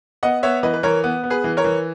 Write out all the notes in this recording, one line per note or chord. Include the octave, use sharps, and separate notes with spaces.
B3 D#5 F#5
B3 C#5 E5
E3 B4 D#5
B4
E3 A#4 C#5
B3
B3
G#4 B4
E3
A#4 C#5
E3